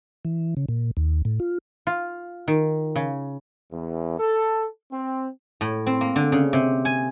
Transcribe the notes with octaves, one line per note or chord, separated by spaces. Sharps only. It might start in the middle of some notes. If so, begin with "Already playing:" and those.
E3
C#3
A#2
D#2
A2
F4
F4
D#3
C#3
E2
A4
C4
A2
C4
A#3
D3
C#3
C3
G#5